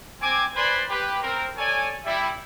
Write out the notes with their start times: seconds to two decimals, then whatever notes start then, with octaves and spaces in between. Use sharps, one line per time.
0.21 C4 G#5 D6
0.55 B4 C5 D5 G#5 B5 C6
0.90 G4 B4
1.22 C4 A#4
1.57 A4 C#5 D5 G#5
2.05 G3 E4